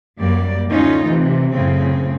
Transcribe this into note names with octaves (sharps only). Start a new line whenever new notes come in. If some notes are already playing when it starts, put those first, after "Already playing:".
F#2 F#3 G3 A#3 D5
D2 A2 C#4 D#4 F4 D#5
C3 E3
F#2 A2 C#3 C4